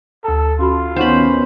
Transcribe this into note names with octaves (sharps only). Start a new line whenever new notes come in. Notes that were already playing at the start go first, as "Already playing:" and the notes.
D2 A4 A#5
C#4 F4 F#4 B5
D#3 B3 C#4 D#4 C5 F#5 B5 C#6